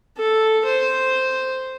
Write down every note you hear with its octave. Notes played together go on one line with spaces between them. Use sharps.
A4
C5